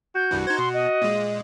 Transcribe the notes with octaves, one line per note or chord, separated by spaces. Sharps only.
F#4 G6
C2 G2 E3
D#4 C5 G#6
B2 C6
D#5
A#2 G#3